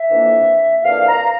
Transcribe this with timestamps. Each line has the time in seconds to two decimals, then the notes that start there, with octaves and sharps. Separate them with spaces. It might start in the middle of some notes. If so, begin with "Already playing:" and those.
Already playing: E5
0.09 F2 E3 A#3 D4
0.84 F2 E3 A#3 D4 F5
1.08 A#5